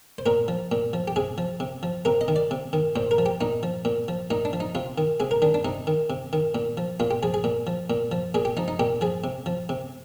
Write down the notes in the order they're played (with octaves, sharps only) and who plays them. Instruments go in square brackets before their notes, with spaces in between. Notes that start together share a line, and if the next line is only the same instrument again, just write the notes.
[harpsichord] C5
A#2 A#4
F3
A#2
F3
G4
C3 G#4
F3
C3
F3
C3 A#4
D#5
D#3
D5
C3
D#3
A#2 C5
A#4
F3
G4
A#2 D#4
F3
A#2
F3
A#2 D#4
D4
F3
D#4
C3 F4
D#3
C3 G#4
A#4
D#3 D4
D4
C3 D#4
D#3
C3
D#3
A#2
F3
A#2 F4
G4
F3 G#4
G#4
A#2
F3
A#2
F3
A#2 G#4
G4
F3 D#4
D#4
A#2 G4
F3 G#4
C3
F3
C3